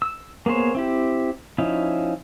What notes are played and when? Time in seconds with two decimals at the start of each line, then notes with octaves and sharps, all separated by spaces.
0.02 E6
0.46 A#3 B3 G#4 C5 C#5
0.75 C4 E4 G4
1.58 F3 C#4 D#4 E4